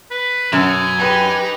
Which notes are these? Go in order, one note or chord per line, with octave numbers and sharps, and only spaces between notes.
B4
F#2 B2 G#5
D#4 G4 B4